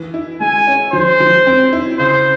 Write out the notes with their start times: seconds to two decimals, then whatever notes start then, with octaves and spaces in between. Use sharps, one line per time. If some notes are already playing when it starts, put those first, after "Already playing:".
Already playing: E3
0.14 E4
0.40 G#3 G#5
0.67 C#4
0.93 F3 C5
1.20 F3
1.47 C4
1.73 E4
1.99 C#3 C5